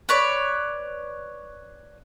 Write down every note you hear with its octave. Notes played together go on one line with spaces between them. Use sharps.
B4 C#5 D5